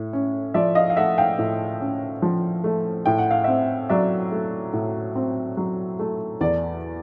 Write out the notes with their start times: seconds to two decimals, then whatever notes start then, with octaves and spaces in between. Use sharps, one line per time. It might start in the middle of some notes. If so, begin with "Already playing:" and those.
Already playing: A2
0.13 C#4
0.54 F3 D5 E5
0.75 D#5 F5
0.90 F5
0.97 A3 E5 F#5
1.18 F5 G5
1.39 A2
1.80 C#4
2.22 F3
2.64 A3
3.06 A2 G5
3.18 F#5
3.31 F5
3.44 C4 E5 F#5
3.89 F#3 D5 E5
4.32 A3
4.73 A2
5.16 C4
5.57 F#3
5.99 A3
6.41 E2 D5